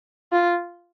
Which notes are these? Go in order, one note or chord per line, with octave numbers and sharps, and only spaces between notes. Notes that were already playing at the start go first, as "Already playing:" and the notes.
F4